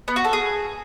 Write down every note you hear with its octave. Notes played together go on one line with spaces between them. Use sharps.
B3
F#4
A4
G#4